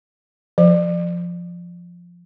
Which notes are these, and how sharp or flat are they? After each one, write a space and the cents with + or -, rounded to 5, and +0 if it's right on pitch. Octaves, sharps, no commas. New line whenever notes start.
F3 +0 C5 -15